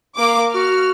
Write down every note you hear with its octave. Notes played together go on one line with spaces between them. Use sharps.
A#3 D6
F#4 F6